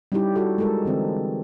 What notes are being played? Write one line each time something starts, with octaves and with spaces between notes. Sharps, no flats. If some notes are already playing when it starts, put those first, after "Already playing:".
G3 C#4 D#4 E4 G4
F#4 G4 A4
G#3 A4 A#4
D3 E3 C4